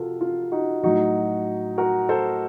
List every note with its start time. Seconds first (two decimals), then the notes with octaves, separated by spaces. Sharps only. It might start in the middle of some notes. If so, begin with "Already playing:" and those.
Already playing: C3 F4 F#4 A4 A#4
0.21 F4
0.52 D#4 F#4
0.83 A2 F#3 D#4 F#4
1.78 F#4 A#4
2.09 A4 C5